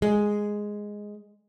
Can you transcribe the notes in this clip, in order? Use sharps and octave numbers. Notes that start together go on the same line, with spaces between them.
G#3